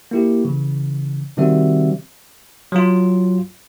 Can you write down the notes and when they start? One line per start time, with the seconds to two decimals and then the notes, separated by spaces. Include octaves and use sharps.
0.11 A#3 E4 G4
0.45 C#3 E3
1.37 C3 D#3 G3 C4 F#4 E5
2.72 F#3 F4